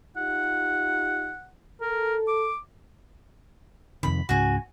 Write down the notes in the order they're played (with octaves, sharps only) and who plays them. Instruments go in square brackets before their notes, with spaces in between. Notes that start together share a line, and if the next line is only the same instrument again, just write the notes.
[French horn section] D#4 F4 G4 [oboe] F#5
[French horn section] A4 [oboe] A#4
[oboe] D6
[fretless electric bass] F2 C3 D#3 [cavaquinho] B5
[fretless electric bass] C#2 G#2 C#3 [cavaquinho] F#4 G#5